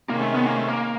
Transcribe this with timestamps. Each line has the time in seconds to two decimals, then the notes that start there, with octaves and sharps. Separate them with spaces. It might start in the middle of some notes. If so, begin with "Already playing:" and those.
0.09 C3 D#3 G#3 A#3 C#4
0.21 A3
0.35 B3
0.47 A#3
0.57 A3
0.68 A#3